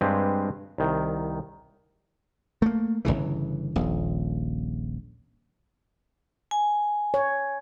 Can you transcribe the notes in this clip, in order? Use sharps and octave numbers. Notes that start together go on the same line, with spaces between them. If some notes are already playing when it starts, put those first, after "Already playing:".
G2 G#3 C4 G4 B4
C2 D#3
A3 A#3
G1 C#2 C#3 E3
D#1 A#1
G#5
C#5